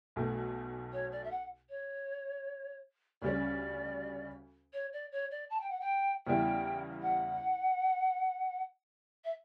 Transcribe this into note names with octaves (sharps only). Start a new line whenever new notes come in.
B1 B2 A3
C#5
D5
E5
F#5
C#5
D2 C#3 G3 C#4 D5
C#5
D5
C#5
D5
A5
G5
F#5
G5
E2 C#3 G3 B3 E4 G5
F#5
E5